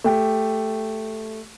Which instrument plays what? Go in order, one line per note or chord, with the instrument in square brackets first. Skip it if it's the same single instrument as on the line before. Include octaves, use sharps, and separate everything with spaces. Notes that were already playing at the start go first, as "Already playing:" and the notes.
[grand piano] A3 G4